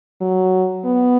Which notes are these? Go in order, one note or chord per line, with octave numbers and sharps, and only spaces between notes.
F#3
B3